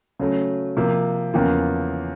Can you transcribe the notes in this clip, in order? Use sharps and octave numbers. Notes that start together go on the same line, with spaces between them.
C#3 F#3 A3
C3 F3 A#3
E2 C#3 F3 A#3